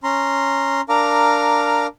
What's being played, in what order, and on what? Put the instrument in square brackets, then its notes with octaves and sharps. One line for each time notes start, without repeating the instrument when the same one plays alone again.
[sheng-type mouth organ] C#4 A#5 C6
D4 A#4 F5 A#5 D6 F6